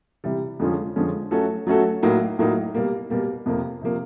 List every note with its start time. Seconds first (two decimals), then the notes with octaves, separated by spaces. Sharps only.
0.24 C3 E3 G3
0.60 F2 D3 F3 G#3 C#4
0.96 F2 D3 F3 G#3 C#4
1.31 F#3 A3 C#4 F#4 A4
1.67 F#3 A3 C#4 F#4 A4
2.02 A2 F#3 A#3 D#4
2.39 A2 F#3 A#3 D#4
2.75 B2 G3 A#3
3.10 B2 G3 A#3
3.46 F2 C3 F3 A#3
3.82 C3 F3 A#3